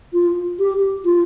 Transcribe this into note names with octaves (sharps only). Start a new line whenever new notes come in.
F4
G4
F4